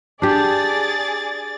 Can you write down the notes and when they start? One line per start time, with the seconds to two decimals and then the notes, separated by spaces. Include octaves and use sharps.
0.22 D4 G4 G#4 D5 A6